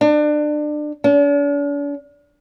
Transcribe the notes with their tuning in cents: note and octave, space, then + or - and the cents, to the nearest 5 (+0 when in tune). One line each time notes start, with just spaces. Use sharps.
D4 +30
D4 -45